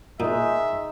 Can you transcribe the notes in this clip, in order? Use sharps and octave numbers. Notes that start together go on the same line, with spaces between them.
A#2 G#3 D#4 E5